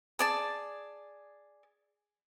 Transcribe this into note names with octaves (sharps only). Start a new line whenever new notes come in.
G#4 D5 A5